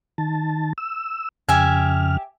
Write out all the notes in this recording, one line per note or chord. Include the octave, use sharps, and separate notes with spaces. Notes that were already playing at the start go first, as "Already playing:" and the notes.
D#3 A5
E6
F2 C#3 G4 E5 G#5 F6